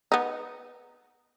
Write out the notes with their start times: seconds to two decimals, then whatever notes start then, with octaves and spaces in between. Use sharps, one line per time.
0.12 B3 D#4